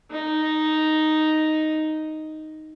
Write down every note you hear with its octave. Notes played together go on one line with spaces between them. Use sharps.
D#4